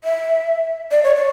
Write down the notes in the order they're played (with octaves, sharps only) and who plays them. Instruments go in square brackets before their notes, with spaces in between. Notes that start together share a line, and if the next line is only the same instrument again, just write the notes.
[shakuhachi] E5
D5
C#5
D5